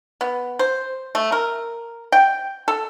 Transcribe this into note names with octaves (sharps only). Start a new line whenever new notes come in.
B3
C5
A3
A#4
G5
A4